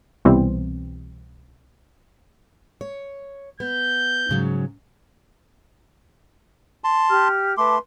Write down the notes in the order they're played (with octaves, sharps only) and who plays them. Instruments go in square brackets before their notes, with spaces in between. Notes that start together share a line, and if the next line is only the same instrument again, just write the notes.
[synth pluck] C2 B2 E3 G3 C4
[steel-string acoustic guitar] C#5
[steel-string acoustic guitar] B3 [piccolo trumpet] G6
[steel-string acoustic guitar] G#2 C#3 F#3
[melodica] A5 C6
[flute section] G4 F6
[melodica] A3 C6 [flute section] B4 A5 D6